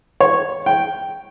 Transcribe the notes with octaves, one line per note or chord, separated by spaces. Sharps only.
C#5
G5